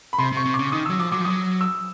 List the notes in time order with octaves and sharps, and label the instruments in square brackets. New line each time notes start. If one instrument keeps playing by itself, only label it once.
[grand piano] B5
[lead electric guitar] C3 [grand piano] C6
[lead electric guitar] C3
[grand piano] C#6
[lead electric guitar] C3
[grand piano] D6
[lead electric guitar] C#3
[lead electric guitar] D#3 [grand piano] D#6
[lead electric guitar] F#3 [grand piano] E6
[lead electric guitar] F3 [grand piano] D6
[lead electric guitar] F#3 [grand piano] D6
[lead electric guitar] F3
[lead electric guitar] F#3 [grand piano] D#6
[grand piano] E6